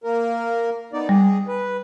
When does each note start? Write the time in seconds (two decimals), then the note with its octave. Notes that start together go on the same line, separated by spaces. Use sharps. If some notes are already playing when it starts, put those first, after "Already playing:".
0.04 A#3 A#4
0.93 B3 D#4 D5
1.09 G3 G#4
1.48 B4